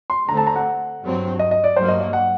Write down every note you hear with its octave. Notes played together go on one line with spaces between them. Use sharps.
C6
D3 A3 C4 A#5
A5
A#5
F#5
G2 F#3 C4
D#5
D#5
D5
G2 F#3 A#3 C5
D#5
D#5
F#5